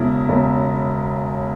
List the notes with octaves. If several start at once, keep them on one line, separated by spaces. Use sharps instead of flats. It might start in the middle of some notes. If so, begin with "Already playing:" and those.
Already playing: E1 E2 C#3 E4
E1 E2 C#3